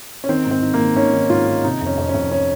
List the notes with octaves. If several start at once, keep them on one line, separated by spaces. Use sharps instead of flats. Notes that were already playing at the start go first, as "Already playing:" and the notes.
C#4
D#3 C4
G#2
C4
D#3
A#3
D#3
D#3 C#4
D#3
G#2 F4
D#3
C3 D#4
F2
C#4
F2
C#4
F2
C#4